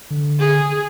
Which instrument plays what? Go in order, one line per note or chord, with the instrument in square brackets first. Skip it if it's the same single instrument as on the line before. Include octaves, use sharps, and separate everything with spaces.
[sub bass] D3
[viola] G#4